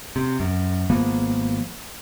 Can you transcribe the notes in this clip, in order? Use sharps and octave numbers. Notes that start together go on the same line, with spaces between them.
C3
F#2
G#1 F3 A#3 B3